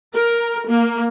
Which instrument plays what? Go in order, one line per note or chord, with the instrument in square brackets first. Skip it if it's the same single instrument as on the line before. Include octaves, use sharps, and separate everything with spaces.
[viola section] A#4
A#3